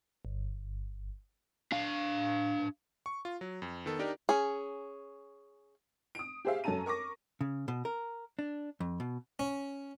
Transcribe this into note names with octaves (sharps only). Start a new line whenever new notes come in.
G1
D4 F5
C#6
F4
F#3
F2
D#3 B3 A4
D4 D#4 G4 A#4 D5
C#4 G#4
D#6 D7
G4 G#4 C5 E5 F5
F#2 C#4 A4 A5 A#5 D#7
A#4 C#6 D6 A#6
C#3
B2
A#4
D4
F2
B2
C#4